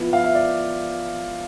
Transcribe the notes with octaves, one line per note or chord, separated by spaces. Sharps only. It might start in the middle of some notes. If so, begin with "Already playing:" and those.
Already playing: F3 B3 E4
F5
E5
D5